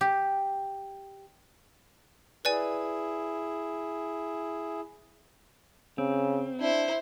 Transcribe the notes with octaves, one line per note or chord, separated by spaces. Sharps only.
G4
E4 G#4 B4 D5 G#5
C#3 C4
D4 E4 C5